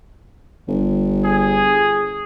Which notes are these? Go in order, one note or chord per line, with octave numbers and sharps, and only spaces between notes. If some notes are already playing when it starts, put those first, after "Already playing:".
G1
G#4